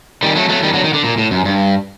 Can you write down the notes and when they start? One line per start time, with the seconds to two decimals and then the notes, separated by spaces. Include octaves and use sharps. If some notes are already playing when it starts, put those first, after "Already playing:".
0.23 D#3 G3
0.36 F#3 A3
0.49 F#3 A3
0.63 D#3 G3
0.73 D3 F#3
0.84 D#3
0.94 D3
1.04 A#2
1.18 A2
1.31 F#2
1.45 G2